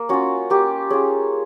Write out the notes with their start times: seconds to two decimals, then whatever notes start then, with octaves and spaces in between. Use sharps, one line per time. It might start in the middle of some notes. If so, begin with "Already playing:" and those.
Already playing: A#3
0.09 C#4 F4 F#4
0.50 A#3 G4
0.90 C#4 F4 G#4